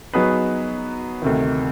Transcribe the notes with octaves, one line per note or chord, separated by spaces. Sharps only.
F#3 B3 D#4 G#4 B4
D2 C3 D#3